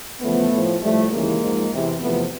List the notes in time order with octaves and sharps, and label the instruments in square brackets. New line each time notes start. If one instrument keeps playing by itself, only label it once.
[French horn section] E2 C#3 F3 A3 B3
A2 F3
A2 F3 G3 A3
D#2 C#3 E3 G#3 A#3
G#2 F3
E2 C3 E3
E2 C3 F3 A3 B3